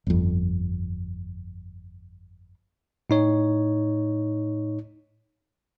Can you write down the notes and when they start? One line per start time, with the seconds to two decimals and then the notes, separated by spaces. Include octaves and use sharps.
0.07 G1 F2
3.10 A2 D#4 C#5